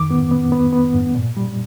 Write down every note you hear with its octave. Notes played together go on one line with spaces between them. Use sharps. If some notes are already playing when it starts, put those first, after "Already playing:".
Already playing: F2 D#3 D6
B3
B3
B3
B3
G2
A#2
G3